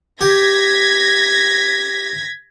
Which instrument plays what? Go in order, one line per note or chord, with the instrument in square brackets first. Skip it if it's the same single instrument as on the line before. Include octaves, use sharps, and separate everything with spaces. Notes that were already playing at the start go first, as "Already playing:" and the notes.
[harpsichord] G4 [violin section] G#6 A#6 B6